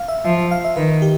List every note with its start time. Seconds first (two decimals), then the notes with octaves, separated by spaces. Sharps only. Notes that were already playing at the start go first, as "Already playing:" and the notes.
Already playing: F5
0.08 E5
0.25 F3 E5
0.39 E5
0.51 F5
0.64 E5
0.77 D#3 B4
1.02 G4